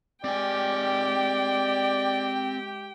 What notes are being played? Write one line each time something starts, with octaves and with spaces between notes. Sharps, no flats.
G#3 C4 G4 D5 G5 G#5